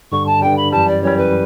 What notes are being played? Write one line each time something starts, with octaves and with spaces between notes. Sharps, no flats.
G2 D3 G3 C#6
A5
G2 D3 G3 G5
B5
F#2 E3 G3 A5
D5
F#2 E3 G3 C#5
B4